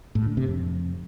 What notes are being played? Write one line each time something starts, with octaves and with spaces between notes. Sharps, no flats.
A2
D3
C3
F2